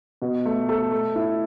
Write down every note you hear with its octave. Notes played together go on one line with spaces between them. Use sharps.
B2
A3
A4
A3
E4